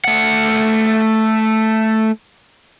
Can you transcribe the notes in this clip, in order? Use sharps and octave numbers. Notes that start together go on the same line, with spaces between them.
A3 F#5